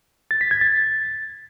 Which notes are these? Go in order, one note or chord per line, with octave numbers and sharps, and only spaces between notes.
A6
B6
G#6
A6